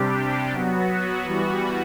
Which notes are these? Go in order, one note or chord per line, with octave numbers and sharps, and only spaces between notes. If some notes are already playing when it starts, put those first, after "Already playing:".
Already playing: C3 G3 D4 G4
F#3 B3 F#4
E3 G3 B3 F#4